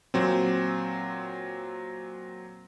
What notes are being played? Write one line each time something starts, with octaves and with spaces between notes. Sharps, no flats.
A#2 F#3 C4